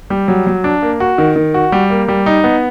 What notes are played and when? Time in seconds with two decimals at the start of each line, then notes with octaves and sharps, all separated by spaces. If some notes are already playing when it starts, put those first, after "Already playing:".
0.10 G3
0.28 F#3
0.47 F#3
0.64 D4
0.82 A#3
1.00 F#4
1.18 D#3
1.36 D#3
1.54 F#4
1.72 G3
1.90 A#3
2.08 G3
2.26 D#4
2.44 B3